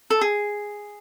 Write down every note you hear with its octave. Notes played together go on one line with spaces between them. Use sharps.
A4
G#4